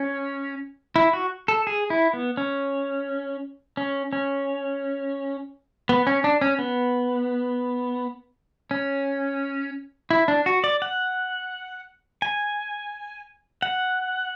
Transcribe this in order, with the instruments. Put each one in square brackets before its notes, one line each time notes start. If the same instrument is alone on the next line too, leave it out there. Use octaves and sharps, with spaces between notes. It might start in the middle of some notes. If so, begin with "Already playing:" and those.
Already playing: [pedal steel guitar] C#4
E4
F#4
A4
G#4
E4
B3
C#4
C#4
C#4
B3
C#4
D4
C#4
B3
C#4
E4
D4
F#4
D5
F#5
G#5
F#5